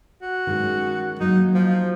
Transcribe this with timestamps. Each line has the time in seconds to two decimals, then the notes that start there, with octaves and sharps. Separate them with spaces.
0.22 F#4
0.47 D#3 G#3 C#4
1.20 F#3 A#3 D#4
1.55 F3